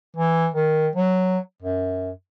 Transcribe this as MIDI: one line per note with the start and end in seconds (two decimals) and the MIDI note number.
0.17 0.48 52
0.54 0.88 51
0.96 1.39 54
1.63 2.10 42